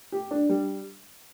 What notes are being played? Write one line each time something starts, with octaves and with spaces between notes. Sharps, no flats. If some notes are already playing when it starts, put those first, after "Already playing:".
G4
D4
G3